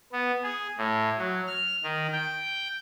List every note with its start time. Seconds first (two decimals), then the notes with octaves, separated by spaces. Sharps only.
0.12 B3
0.43 G#4
0.78 A2
1.18 F#3
1.47 F6
1.83 D#3
2.13 G5